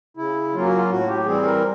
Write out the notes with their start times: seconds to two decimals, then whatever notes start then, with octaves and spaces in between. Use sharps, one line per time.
0.17 C#3 E4
0.53 F#3 A#3 C#4 F4
0.66 F#4
0.77 F4
0.90 A2 F#4
1.08 G4
1.26 E3 G3 C4 G#4
1.45 A#4